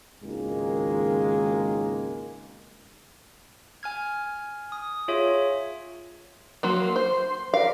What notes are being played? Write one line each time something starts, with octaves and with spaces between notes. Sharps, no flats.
G#1 C#2 D#3 G#3 A#3
G#5 F6 G#6
D#6
F4 G#4 C#5 E5
F#3 A#3 C6
C5
A#4 B4 D5 F5